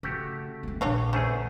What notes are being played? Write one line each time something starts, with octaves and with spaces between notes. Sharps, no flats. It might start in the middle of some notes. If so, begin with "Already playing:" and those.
C#3 A3 F#4 G4
A#3 C#4
A#1 C#3 D4 C#5 F5
E2 A3 C#4 G#4 C5